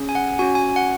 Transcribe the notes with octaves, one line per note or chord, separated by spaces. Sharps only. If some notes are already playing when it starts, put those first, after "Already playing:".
Already playing: C#4 G#4
G#5
F#5
C#4 F#4 G#5
G#5
F#5